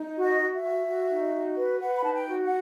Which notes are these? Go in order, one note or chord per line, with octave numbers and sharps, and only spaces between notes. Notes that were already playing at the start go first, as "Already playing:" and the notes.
Already playing: D#4
F#4
D#5
F#4
E5
F#4
F#4
D#4
F#4
B4
B4 F#5
B5
D#4 A5
G5
F#4
F#5